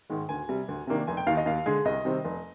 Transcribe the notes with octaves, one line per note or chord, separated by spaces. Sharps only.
G#2 D#3 G#3
D2 G#5
C3 G3
D2
C3 D#3 A#3 D4
F1 G#5
G5
D#2 D#3 F5
D#5
D#2 F5
D3 G#3 G#4
C2 D#5
C3 D#3 G3 C4
F1